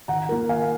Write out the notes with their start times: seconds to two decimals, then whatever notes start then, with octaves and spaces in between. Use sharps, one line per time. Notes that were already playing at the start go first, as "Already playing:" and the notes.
0.08 D#3 F#5 A#5
0.29 A#3 F4 A#4
0.49 D#3 F5 G#5